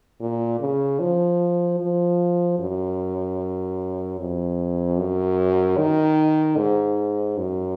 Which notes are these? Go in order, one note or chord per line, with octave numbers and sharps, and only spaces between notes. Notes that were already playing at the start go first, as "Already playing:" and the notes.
A#2
C#3
F3
F3
F#2
F2
F#2
D#3
G#2
F#2